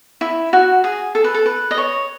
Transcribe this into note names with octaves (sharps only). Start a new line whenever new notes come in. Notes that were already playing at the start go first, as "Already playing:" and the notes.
E4
F#4
G#4
A4
B4
A4
B4
D#5
C#5